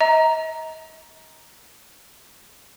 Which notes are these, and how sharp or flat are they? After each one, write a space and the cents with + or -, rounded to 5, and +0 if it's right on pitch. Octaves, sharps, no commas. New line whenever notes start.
D#5 +40 A#5 +0